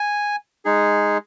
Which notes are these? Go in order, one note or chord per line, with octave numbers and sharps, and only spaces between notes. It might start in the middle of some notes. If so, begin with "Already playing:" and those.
Already playing: G#5
G#3 D#4 G#4